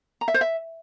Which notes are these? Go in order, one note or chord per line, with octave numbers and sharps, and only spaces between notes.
A#5
E5
C5
E5